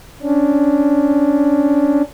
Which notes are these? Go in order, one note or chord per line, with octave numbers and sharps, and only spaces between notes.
C#4 D4